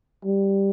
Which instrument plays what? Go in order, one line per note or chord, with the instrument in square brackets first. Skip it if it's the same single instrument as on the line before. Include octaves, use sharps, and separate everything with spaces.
[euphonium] G3